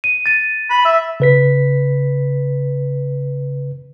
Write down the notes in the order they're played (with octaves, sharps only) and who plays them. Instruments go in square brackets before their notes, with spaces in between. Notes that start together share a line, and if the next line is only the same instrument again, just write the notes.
[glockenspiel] D#7
A6 D#7
[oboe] B5
E5
[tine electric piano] C#3 B4 B6